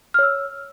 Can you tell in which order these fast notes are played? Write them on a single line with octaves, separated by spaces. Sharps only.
F6 C#5 E6